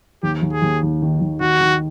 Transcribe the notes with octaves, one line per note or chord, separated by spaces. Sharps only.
D#2 G4
D#2
G#4
D#2
D#2
D#3
D#2
D#3 F#4
D#3